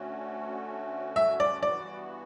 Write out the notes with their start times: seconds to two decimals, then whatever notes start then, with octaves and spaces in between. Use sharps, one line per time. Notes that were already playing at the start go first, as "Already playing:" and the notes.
Already playing: D2 D3 A3 C#4 F#4
1.16 E5
1.40 D5
1.63 G2 E3 B3 F#4 D5